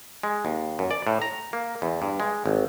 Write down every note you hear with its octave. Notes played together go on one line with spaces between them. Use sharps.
G#3
D#2
F#2
D5
A2
A#5
A#3
E2
G2
G#3
G#1